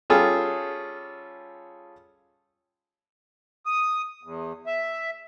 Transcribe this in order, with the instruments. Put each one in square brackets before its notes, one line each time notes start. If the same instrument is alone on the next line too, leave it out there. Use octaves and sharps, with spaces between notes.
[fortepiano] G3 C#4 F4 G#4 A4
[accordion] D#6
E2
E5